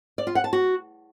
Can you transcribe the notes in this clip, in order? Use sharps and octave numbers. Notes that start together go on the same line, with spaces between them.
D5
F4
F#5
A5
F#4